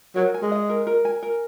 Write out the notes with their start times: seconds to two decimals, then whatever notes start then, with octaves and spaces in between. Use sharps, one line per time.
0.15 F#3 A#4
0.34 G#5
0.42 G#3
0.52 D#5
0.69 A#4
0.87 A#4
1.05 G#5
1.23 A#4